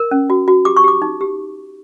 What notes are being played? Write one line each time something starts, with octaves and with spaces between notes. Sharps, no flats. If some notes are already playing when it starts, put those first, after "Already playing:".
Already playing: A#4
C#4
F#4
F#4
G4 D6
C#6
G4 D6
D#4
G4